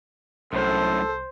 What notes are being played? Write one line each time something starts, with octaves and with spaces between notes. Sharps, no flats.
C2 F#2 A2 A4 C5